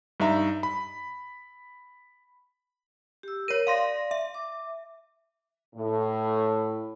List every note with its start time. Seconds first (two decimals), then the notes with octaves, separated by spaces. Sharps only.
0.20 G2 D#4 E5 A#5
0.63 B5
3.23 G4 E6
3.48 A#4 C#5 D#7
3.67 D5 F5 C6 A#6
4.11 E5
4.34 D6
5.75 A2